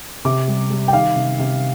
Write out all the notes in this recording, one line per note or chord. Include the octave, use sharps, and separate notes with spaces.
C3 D6
G3
G3
G5
D#3 F5
C3
C3